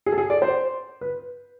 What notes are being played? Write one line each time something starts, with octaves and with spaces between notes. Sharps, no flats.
G#4
A4
G#4
D5
C5
B4